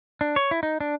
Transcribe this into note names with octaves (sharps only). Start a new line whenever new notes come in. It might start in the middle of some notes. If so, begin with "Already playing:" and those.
D4
C#5
E4
D#4
D4